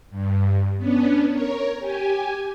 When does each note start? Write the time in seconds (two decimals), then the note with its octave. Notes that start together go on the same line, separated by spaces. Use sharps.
0.10 G2
0.78 B3 C#4 D4
1.30 A#4 C#5
1.79 G4 G#5